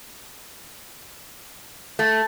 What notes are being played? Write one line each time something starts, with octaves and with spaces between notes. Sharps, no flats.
A3